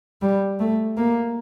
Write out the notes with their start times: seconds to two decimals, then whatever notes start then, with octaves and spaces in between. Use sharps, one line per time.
0.22 G3
0.60 A3
0.97 A#3